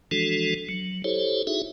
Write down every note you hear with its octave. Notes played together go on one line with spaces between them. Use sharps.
E3 F3 G#3 D4 F#4 A4
F#3
E4 G4 A4 C5 C#5
D#4 E4 F#4 G#4 E5